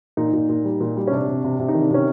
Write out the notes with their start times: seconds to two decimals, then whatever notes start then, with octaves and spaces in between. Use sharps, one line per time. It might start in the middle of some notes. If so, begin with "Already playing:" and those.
0.17 A#2 D#4
0.33 A#2
0.49 A#2
0.65 G3
0.80 A#2
0.97 G3
1.07 C#4
1.12 C3 D4
1.28 C3
1.44 C3
1.59 C3
1.68 D#4
1.75 D#3
1.82 D4
1.91 C3 C#4